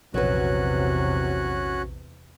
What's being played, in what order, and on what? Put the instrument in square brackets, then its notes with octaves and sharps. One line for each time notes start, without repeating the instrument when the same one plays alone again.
[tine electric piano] A#1 [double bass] E2 C3 [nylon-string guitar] F#3 B4 [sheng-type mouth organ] C#4 F#4 F#6